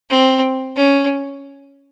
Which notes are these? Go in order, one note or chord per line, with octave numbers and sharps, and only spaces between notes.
C4
C#4